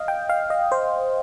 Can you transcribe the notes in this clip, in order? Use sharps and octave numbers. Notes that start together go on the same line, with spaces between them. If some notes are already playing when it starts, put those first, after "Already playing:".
Already playing: D#5 F5
G5
F5
D#5
C5